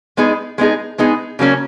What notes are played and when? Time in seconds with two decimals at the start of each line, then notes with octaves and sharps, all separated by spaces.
0.17 G#3 B3 D#4 G#4
0.58 G#3 B3 D#4 G#4
0.98 G#3 B3 D#4 G#4
1.39 C#3 F#3 A#3 C#4